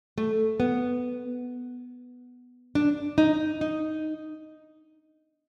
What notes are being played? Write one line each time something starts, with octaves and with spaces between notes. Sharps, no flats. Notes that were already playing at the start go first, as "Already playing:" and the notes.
A3
B3
D4
D#4
D#4